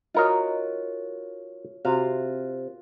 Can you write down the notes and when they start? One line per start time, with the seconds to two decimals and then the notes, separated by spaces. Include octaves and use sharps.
0.14 D#4 F4 F#4 A#4 C#5 D#5
1.85 C3 F4 F#4 F5